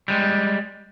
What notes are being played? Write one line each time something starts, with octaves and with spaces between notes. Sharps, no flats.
G3 G#3